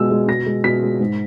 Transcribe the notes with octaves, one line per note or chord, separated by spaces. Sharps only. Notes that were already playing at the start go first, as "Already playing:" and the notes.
Already playing: B2 G#3 E6
G#3
B2 A#6
G#3
B2 B6
G#3
G#2